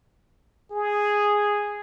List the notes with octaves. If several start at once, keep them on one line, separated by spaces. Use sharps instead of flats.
G#4